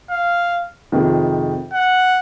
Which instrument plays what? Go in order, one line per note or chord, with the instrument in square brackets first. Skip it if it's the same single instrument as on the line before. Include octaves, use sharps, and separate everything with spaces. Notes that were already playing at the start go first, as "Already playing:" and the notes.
[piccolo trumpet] F5
[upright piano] F2 C3 D#3 G#3
[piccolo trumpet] F#5